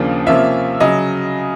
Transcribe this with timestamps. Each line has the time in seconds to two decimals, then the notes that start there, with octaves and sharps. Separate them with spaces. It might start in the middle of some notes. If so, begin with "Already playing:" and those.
Already playing: D#2 C#3 F3 A#3 D4
0.26 C3 F3 A#3 C#4 F4 E5
0.80 C#3 F#3 D#5